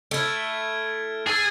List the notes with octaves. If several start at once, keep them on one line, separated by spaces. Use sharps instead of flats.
A3 E4 F6 G#6 D7
G#4 E6 G#6 A6